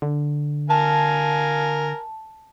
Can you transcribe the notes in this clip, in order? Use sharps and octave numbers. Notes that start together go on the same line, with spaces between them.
D3
A#4 F5 G#5 A5